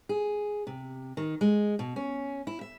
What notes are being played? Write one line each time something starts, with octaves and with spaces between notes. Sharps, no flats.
G#4
C3
D#3
G#3
B2
C#4
E4
E5